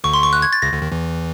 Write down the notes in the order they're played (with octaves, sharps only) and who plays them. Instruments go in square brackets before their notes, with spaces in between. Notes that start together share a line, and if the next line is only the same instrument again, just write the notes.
[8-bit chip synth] D2 D3 [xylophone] C#6
[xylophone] C6
C#6
F#6
G#6
A6
[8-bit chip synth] C#2 C#3 [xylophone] A#6
[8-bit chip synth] D2 D3
D#2 D#3
E2 E3